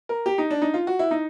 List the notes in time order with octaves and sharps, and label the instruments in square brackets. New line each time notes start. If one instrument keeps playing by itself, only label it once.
[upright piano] A#4
G4
D#4
D4
D#4
F4
F#4
E4
D#4